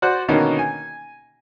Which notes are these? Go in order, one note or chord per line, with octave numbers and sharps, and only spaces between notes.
F#4 C5 D5 F#5 F#6
B2 D3 D#3 A#3 C#4 D#4
G#5